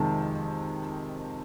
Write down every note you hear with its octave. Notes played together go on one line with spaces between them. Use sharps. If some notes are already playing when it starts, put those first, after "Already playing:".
Already playing: F2 C3 D#3 G#3 A5